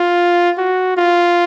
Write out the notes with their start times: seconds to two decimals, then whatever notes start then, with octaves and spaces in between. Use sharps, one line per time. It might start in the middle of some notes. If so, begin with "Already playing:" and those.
Already playing: F4
0.58 F#4
0.97 F4